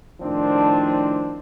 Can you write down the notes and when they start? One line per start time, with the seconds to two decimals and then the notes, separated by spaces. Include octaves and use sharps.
0.21 A2 D#3 F3 C4 D4